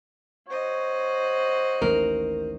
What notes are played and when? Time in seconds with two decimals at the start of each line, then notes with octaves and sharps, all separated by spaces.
0.48 F#4 C5 C#5 D#5
1.82 A1 D#2 A#4